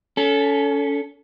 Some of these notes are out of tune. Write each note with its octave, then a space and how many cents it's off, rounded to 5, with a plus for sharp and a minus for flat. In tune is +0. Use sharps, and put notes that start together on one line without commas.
C#4 +25 A4 +0